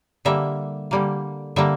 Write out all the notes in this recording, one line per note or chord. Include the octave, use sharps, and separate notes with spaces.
D3 G3 A#3 E5
D3 G3 A#3
D3 G3 A#3 E5